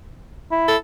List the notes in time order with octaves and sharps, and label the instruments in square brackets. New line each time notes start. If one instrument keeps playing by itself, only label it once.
[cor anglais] E4
[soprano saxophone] A4